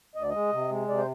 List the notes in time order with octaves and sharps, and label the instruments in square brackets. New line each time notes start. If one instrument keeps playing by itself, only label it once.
[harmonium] D2 D#5
D5
G#3 D#5
C3
G#3
C3 D5
C5